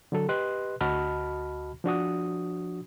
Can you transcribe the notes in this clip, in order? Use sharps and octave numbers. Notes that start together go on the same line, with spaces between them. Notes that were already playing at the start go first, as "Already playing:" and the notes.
D3 F#3 A4
G4 B4 D#5 C6 F#6
D2 F#4 D#5 A5 B5 F6
F3 D4 F#4 D#6